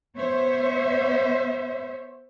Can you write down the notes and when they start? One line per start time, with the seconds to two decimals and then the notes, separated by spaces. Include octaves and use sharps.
0.15 B3 C5 C#5 E5